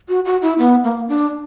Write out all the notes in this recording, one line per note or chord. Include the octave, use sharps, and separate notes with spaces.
F#4
F#4
E4
B3
A#3
D4